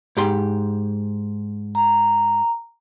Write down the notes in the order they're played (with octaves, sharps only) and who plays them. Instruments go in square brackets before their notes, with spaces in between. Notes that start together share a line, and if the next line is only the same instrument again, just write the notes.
[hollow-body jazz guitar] G#2 G4 C6
[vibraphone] A#5